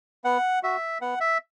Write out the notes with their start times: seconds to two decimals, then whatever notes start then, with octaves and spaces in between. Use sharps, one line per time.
0.24 B3 F#5
0.63 F#4 E5
1.01 B3 F#5
1.20 E5